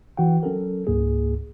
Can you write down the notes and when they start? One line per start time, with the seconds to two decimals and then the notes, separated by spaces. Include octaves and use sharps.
0.17 E3 F#4 F#5 G5
0.43 F#3 C#4 A4 A#4
0.87 C#2 G#2 A#3 G#4